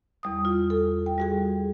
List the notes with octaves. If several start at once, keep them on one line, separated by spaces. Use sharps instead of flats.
E2 G3 D#6
F4
A4
G5
G3 F#4 G#4